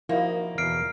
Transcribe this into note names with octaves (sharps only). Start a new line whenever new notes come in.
F3 A#3 D#4 E4 F#4 D#5
E2 B2 F6 C7 D7